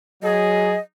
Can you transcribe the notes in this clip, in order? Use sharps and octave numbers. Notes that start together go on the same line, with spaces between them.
F#3 G#4 D#5